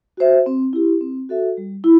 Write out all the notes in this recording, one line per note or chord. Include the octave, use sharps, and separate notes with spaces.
F#4 C5 E5
C4
E4 G4
C4
F#4 A4 E5
G3
E4